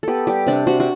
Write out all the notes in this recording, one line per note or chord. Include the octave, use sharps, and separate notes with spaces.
B3 G4 A4
G3 G4
C3 D4
C3 F#4
F#4